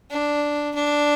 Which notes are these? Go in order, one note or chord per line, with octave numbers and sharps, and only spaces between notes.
D4
D4